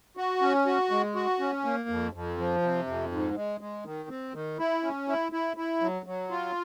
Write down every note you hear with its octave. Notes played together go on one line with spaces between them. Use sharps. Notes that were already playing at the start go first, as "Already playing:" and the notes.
F#4
C#4
F#4
G#3
F#4
C#4
A#3
F2
F2
F3
C3
F2
G#2
G#3
G#3
D#3
C4
D#3
E4
C#4
E4
E4
E4
F#3
F#3
F4